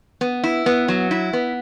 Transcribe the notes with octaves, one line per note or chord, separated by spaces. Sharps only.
B3
E4
B3
F#3
E4
B3